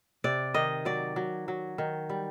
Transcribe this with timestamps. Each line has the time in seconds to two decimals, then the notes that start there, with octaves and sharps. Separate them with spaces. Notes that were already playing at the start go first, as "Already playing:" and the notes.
0.24 C3 D5
0.54 D#3 D#5
0.85 F#3 D5
1.16 F#3
1.48 F#3
1.78 D#3
2.10 G3